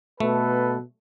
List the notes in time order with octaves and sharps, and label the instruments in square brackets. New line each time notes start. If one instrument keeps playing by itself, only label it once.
[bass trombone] B2 [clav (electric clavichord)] A3 [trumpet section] A4 B4